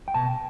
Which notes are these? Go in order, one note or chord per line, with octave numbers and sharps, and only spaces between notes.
G5
B2 A5